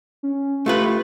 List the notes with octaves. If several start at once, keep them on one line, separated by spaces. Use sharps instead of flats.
C#4
A3 F4 G4 B4